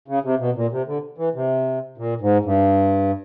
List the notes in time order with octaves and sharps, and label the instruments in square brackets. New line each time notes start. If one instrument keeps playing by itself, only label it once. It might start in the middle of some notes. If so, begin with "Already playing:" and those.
[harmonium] C#3
C3
B2
A#2
C3
D3
E3
C3
A#2
G#2
G2